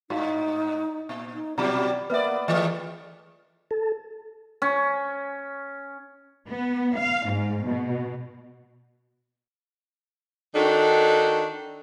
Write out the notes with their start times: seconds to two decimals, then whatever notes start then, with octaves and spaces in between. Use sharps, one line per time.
0.10 G#2 D#4 F#4 F5
1.09 A#2
1.34 D#4
1.58 B2 F#3 G3 E4 F4 D5 A#5
2.10 A#3 B3 B4 D5 E5
2.48 E3 A3 G#4 B4 D#5
3.71 A4
4.62 C#4
6.48 B3
6.98 F5
7.32 G#2
7.68 B2
10.55 D#3 D4 D#4 F#4 A4